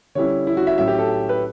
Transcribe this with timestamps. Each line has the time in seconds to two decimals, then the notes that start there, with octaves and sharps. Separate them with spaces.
0.15 D3 G3 C#4 E4 C#5
0.47 E4
0.57 F#4
0.67 E5
0.77 A2 F#3 C#4 E5
0.88 G4
0.99 A4
1.29 B4